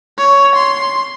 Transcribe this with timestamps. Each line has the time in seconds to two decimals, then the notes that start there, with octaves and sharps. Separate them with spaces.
0.18 C#5
0.55 C6